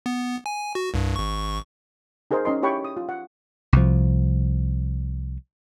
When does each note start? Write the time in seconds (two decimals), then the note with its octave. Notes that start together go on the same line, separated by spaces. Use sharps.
0.06 B3
0.46 G#5
0.75 F#4
0.94 C2 G2
1.16 G#1 C#6
2.31 D#4 G#4 A#4 C5 D#5
2.45 C#4 D#4 D#5 C6
2.62 E4 G4 C#5 G5 B5 C#6
2.85 D#6
2.97 F4
3.09 F#5
3.73 C2 F3